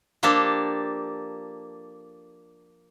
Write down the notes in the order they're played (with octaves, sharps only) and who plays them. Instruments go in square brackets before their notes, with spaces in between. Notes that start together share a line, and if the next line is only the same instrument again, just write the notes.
[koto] F3 A#3 D4 G4 A4